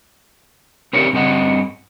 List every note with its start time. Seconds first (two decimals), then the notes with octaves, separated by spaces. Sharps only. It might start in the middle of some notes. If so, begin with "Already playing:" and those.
0.93 C4 D#4 G4 A#4 C#5 D5
1.13 G2 C4 D#5 F#5